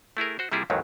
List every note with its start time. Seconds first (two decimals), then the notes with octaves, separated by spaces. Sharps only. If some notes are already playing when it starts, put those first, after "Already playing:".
0.17 A3 E4 G#4 A#4
0.39 F#4 C5
0.52 C3 G3 A#3 E4 F4 G#4
0.70 A1 D#2 G#2 D#3 F#3